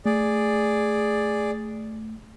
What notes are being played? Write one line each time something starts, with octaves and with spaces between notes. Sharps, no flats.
A3 G#4 D5